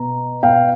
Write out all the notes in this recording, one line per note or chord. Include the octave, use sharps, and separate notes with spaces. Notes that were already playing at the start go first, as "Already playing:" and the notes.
Already playing: B2 A#5
B2 F5 G5